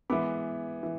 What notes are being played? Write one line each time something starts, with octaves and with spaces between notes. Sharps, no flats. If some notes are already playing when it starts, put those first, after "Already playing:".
E3 G#3 B3 B5 D6
E3